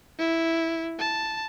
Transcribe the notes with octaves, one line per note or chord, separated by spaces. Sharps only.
E4
A5